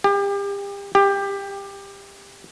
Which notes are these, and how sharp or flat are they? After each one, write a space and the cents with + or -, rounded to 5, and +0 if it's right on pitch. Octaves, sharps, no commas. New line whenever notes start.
G4 +35
G4 +20